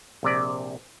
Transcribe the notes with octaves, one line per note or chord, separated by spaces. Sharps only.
A#1 C3 D5